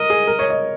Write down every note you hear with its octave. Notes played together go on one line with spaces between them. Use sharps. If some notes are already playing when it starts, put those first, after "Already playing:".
Already playing: A#4 D#5
G#4
A#4
C#5
D#5